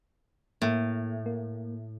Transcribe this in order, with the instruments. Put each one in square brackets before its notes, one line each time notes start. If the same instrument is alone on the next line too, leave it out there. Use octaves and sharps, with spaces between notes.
[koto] A2 [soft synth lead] A#3
[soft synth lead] A#3